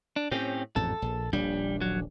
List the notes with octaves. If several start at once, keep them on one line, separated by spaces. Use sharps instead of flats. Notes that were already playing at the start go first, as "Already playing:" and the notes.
D4
A2 C4 C#4 G4
A1 F2 G#2 A4
A#1
D#1 A#1 G3 D4
F#3